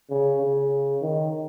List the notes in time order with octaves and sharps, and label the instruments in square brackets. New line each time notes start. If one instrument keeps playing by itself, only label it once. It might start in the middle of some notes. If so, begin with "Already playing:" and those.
[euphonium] C#3
C#3
D#3